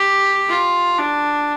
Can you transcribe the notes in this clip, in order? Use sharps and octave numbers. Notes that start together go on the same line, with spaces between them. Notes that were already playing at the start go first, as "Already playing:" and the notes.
Already playing: G4
F4
D4